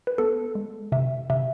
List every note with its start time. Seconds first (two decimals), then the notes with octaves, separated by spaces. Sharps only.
0.07 B4
0.18 B3 A4
0.55 G#3
0.92 C3 E5
1.30 C3 E5